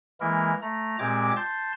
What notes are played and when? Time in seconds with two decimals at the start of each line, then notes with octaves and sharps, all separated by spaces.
0.20 E3 G#3 A#3 E4 A#4
0.62 A3 A#5
0.99 A#2 G#3 C4 G4 D6 G#6
1.37 A5 C6 G6